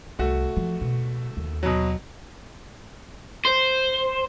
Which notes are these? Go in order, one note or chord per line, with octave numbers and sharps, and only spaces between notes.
C2 A3 F#4
F3
B2
D#2
B2 F#3
C5